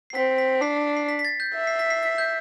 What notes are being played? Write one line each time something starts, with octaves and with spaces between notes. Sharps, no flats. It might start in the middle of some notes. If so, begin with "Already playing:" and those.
C7
C4 B6
B6
D4 C7
C7
B6
B6
A6
G6
E5
C7
B6
C7
B6
G6